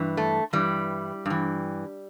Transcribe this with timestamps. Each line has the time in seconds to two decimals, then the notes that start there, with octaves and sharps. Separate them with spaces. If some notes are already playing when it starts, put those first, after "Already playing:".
Already playing: G2 E3
0.17 A3
0.53 G2 E3 G3
1.26 G2 E3